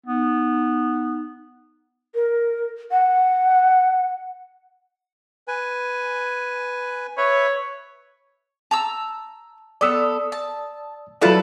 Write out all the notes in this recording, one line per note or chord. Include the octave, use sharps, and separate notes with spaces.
B3 D#4
A#4
F#5
B4 G#5
B4 C#5 E5 B5
A5 A#5 E6
B3 A4 D5 D#6 E6
A5
F#3 E4 F4 A4 B4 D5 F5 A5